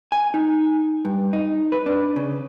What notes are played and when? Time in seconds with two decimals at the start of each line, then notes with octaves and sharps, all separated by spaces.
0.12 G#5
0.34 D#4
1.05 G2
1.33 D#4
1.72 B4
1.86 D4
2.16 C#3